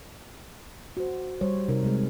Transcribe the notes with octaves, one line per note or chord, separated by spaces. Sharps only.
F#4 C5
G3 C5 C#5
C3 D#4 A#4
C3 G3 G#3 G#4